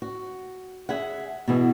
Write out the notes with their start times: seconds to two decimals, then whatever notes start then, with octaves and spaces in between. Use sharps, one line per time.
0.02 F#4
0.89 G#4 E5 F#5
1.48 B2 E3 G#4